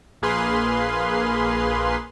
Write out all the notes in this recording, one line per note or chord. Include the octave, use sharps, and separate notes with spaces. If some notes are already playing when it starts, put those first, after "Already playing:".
A#1 A#3 G#4 B4 F5 C6